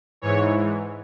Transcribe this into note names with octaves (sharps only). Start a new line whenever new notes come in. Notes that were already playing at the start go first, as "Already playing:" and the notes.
G#2 E3 C#5